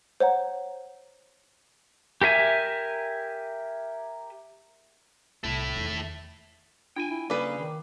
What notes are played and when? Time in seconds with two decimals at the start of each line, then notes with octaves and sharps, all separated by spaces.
0.20 C5 C#5 F#5 A#5
2.21 G4 A#4 E5 G#5
5.44 C2 A3 E4
5.75 E2 D#3
6.96 D4 F4 G5 G#5
7.10 E4
7.30 C#3 G3 A#3 G#4 B4
7.59 D#3